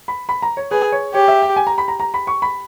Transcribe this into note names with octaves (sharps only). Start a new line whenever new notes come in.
B5
B5
A#5
C#5
G#4 B4
C#5
G4 C#5
E5
G5
G#5
A#5
B5
A#5
A#5
B5
C#6
B5